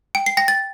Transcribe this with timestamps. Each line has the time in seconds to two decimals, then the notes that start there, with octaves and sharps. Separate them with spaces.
0.15 G5 D7
0.26 C7
0.37 G5 A#6
0.48 A6